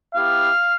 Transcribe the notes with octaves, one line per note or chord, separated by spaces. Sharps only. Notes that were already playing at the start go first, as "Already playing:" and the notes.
B3 E4 G4 F5